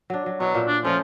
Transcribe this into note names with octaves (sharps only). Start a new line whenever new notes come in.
F#3 D4
F#3
B2 F#3 E4
A#2 E5
D4
F3 A3 C#4